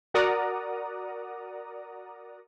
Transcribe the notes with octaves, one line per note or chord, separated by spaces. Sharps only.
F#4 A#4 D5 F#5 A#5 D#6